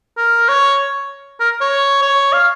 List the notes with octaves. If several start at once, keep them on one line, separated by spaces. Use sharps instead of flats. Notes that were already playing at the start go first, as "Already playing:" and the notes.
A#4
C#5
A#4
C#5
C#5
F5